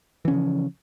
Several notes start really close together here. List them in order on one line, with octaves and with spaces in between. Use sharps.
E3 C#4 C#3 F3